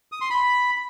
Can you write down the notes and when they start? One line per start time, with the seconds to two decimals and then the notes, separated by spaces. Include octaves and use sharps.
0.12 D#6
0.21 C6
0.30 B5